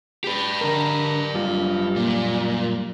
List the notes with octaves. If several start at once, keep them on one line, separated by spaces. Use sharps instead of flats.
G4 B4
D3 A#4
F#2 G3 F4
A#2